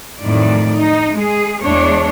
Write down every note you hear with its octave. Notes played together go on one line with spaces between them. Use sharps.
F2 A2 D#3 F#3 D5
D#4
G#3 G#4
E2 G#3 D4 C#5